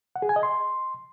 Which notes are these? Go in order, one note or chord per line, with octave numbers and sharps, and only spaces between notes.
F#5
G#4
G#5
D#5
C6